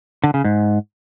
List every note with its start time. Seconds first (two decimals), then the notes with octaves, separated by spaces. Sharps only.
0.24 D3
0.34 C#3
0.44 G#2